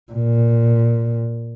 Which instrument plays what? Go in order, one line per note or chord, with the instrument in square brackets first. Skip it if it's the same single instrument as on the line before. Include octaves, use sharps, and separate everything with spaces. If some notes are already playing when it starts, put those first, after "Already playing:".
[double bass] A#2